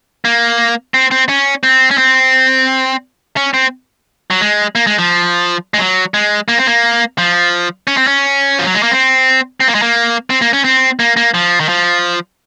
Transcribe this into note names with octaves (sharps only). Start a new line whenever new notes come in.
A#3
C4
C4
C#4
C4
C#4
C4
C#4
C4
F#3
G#3
A#3
G#3
F3
G#3
F#3
G#3
A#3
C4
A#3
F3
C#4
C4
C#4
F3
F#3
G#3
A#3
C4
C4
A#3
G#3
A#3
C4
A#3
C#4
C4
A#3
A#3
F3
D#3
F3